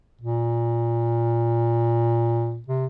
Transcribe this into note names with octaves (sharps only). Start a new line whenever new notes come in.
A#2
C3